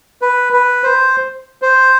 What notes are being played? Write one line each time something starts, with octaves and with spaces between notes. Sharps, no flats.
B4
B4
C5
C5